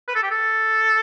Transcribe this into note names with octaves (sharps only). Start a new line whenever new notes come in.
B4
A4
G4
A4